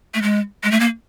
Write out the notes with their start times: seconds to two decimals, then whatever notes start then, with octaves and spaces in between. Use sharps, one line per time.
0.14 A3
0.22 G#3
0.64 G#3
0.71 A3
0.80 A#3